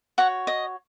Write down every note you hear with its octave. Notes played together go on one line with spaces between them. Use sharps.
F#4 C#5 F#5
D#5